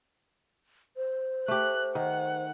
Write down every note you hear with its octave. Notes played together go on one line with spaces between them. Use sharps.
C5
A3 G4 F#6
D#3 F#5